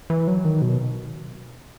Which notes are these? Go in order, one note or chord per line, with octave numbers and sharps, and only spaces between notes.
E3
F#3
D#3
B2